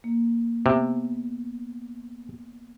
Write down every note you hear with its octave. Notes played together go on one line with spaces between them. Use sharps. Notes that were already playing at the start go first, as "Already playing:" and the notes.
A#3
C3 B3